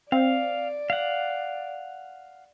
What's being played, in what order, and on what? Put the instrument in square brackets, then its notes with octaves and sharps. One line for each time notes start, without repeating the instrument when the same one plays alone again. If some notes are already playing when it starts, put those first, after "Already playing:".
[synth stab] C4 [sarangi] D5 [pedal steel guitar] F5
[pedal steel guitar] F5 F#5